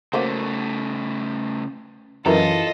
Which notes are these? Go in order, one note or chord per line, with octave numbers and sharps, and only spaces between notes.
C#3 F#3 A3 A#3 C5
F#2 E3 F4 A4 A#4 D#5